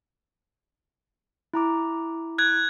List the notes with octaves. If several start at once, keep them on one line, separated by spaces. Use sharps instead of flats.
E4 A#5 D6
F#6 G#6